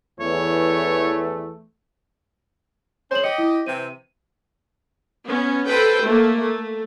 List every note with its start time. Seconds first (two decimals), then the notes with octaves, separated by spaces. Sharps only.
0.20 E2 E3 A3 C#5
3.11 C#4 G#4 C5 C#5 F#7
3.24 G4 D#5 C#7
3.38 E4
3.66 C3 E3 C4 D#7
5.26 B3 C#4
5.68 A4 B4 C5 G5
6.05 A3 A#3
6.43 A3